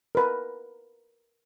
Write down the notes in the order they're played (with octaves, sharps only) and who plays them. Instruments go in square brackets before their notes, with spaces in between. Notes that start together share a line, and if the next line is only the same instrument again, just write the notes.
[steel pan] A#4 B4